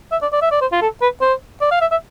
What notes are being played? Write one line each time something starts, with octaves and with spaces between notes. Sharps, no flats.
E5
D5
D5
E5
D5
C5
F4
A4
B4
C5
D5
F5
E5
E5